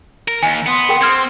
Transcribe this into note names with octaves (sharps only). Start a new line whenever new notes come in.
A#4
D#2 G#5
B3 C6 D#6
G#4 A#4 G5
C4 F6 G#6 C#7